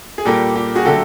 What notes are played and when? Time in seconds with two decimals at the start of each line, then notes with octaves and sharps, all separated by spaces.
0.18 G#4
0.25 A#2 G3 A#3 G4 A4
0.56 G4
0.75 F#4 G#4
0.85 D3 F#3 A3 G4 A4